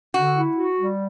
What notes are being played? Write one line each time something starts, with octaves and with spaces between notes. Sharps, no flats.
D3 F#4
E4
F#4
G3